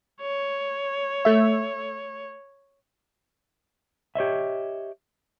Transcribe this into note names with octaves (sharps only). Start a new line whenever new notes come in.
C#5
A3 E5
G4 C#5 D#5 E5